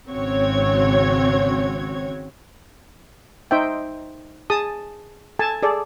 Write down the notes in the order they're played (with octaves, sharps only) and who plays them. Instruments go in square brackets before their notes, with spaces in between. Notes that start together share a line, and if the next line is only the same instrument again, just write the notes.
[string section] G#1 C#3 C4 F#4 C#5 G#6
[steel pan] D#4 C5 E5 G5
G#4 A5 D#6
A4 G#5 A5
G#4 A4 D5